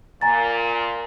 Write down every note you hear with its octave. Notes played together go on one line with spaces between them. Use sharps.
A#2 G#5 A#5 A6